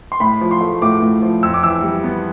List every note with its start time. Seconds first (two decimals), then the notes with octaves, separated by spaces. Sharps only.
0.12 C6
0.20 A2 B5
0.41 F3
0.51 C6
0.61 A3
0.82 A2 D6
1.02 A2
1.22 F3
1.43 F2 E6
1.54 D6
1.63 E3 E6
1.83 G3
2.04 B3